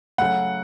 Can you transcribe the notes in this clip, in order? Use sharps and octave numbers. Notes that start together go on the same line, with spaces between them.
C#3 F#3 A3 F#5